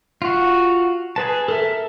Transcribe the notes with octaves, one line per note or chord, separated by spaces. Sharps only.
F4 F#4
G#4 B4 A5
A4 A#4 E5